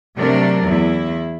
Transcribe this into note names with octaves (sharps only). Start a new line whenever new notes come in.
C3 F#3 A3 D4 A#4 D5
E2 E4